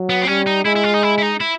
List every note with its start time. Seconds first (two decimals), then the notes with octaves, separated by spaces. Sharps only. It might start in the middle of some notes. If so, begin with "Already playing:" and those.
Already playing: F#3
0.10 B3
0.22 C4
0.27 G3 C#4
0.47 D#4
0.65 G#3 E4
0.76 E4
0.84 F4
0.94 D#4
1.03 E4
1.18 E4
1.22 D#4
1.40 E4